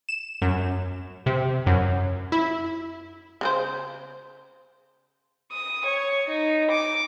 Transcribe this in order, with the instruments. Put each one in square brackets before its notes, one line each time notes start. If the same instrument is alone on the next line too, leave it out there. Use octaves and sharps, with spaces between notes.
[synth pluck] E7
F#2
C3
F#2
E4
[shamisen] C#3 C#4 C5
[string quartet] D#6
C#5
D#4
D6